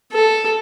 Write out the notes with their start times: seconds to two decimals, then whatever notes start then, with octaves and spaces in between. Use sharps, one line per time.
0.13 A4